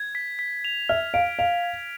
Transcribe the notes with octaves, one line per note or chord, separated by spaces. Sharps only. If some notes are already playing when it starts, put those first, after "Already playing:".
Already playing: G#6
B6
B6
F7
E5 F6
F5 D7
F5 F7
G#6